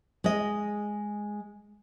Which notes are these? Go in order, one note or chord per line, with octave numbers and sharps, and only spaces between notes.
G#3 D#5